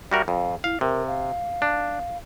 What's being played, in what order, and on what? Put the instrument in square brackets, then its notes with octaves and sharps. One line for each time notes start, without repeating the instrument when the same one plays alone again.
[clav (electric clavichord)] G3 F#4 A#4 [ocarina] E5
[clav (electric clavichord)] F2 [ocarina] F5
[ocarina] E4 [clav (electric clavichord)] F5
[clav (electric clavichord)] C3 [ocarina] A#4
[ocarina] F5
[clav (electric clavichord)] D4